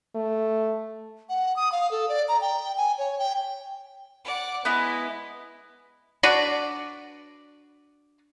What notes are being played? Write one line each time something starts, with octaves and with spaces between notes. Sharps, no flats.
A3
F#5
D#6
F5
A4
D5
A#5
G5
G#5
C#5
G5
D5 F#5
G#3 B3 E4
D4 F#4 B4 D5